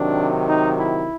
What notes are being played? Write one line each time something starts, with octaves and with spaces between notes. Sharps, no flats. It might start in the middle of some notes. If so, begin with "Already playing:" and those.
Already playing: C3 D#3 F#3 D4
D#4
E4